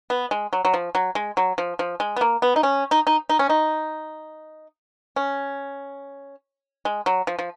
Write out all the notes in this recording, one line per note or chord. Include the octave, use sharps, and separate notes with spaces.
B3
G#3
F#3
F#3
F3
F#3
G#3
F#3
F3
F3
G#3
B3
A#3
B3
D#4
C#4
D#4
D#4
D#4
C#4
D#4
C#4
G#3
F#3
F3
F3